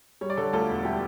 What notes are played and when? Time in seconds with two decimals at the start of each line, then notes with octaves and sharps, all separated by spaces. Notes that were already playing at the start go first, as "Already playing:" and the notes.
0.21 G3 C#5
0.30 D5
0.37 D3 A4 C#5
0.53 D2 F4 A4
0.69 E1
0.85 G3 E4 G4